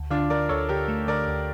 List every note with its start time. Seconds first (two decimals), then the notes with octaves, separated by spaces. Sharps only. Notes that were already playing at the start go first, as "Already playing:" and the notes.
Already playing: D2
0.10 D3 D4 F4
0.30 D3 A#4 D5
0.49 D2 A4 C#5
0.69 D3 G4 A#4
0.88 A3
1.08 D3 A#4 D5
1.28 D2